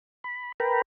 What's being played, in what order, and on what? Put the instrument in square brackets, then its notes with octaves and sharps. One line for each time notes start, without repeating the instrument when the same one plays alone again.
[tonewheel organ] B5
A#4 B4 G5 A#5 B5